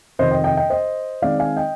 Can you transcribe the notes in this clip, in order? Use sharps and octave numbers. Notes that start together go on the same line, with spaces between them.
F2 C3 D#3 C5 D#5
D#5 G5
D#5 G5
D#5 G5
C5 D#5
D#3 G#3 C4 D#4 D5 F5
F5 G#5
D#5 G5